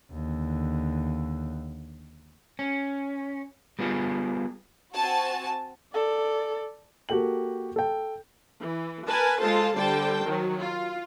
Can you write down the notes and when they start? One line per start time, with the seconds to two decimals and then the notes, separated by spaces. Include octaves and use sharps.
0.12 D#2 D3
2.59 C#4
3.79 G3 B3 F4 G#4
4.94 C4 F#4 G#5 A5
5.93 A4 D5
7.09 A#3 F#4 G4 A4 G5 F#7
7.76 A4 G5
8.60 E3
9.06 A#4 B4 G#5 A5
9.40 G#3 F4 A4 C5 A5
9.75 D3 G3 C5 G5 A5
10.25 D#3 F#3
10.60 F4